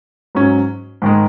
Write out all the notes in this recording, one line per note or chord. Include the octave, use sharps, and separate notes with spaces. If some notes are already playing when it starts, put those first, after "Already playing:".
G#2 F#3 C#4
G#2 D#3 G#3